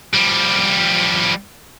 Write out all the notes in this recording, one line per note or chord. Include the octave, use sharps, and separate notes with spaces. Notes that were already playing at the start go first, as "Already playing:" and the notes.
F3 G3